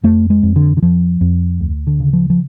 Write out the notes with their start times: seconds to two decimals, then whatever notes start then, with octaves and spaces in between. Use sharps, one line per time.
0.03 F2 A3
0.30 G#3
0.43 F2
0.56 D3
0.77 D3
0.82 F2 F3
1.21 F2
1.60 D2
1.87 D3
2.00 C#3
2.13 F3
2.30 F3